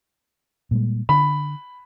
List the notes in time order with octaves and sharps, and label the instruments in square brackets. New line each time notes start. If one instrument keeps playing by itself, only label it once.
[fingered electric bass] A#2 G3 G#3
[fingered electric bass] D3 [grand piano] B5